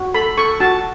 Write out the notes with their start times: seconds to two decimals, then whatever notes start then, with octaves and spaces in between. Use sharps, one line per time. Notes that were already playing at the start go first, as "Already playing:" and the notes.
Already playing: F#4
0.14 A4 B5
0.37 A4 C#6
0.60 F#4 A5